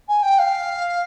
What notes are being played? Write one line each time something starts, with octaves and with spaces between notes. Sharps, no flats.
G#5
G5
F5